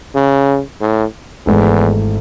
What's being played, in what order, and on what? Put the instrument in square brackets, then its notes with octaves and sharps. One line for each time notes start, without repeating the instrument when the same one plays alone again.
[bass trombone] C#3
A2
[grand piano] G#1 G#2 E3 A3 [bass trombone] E2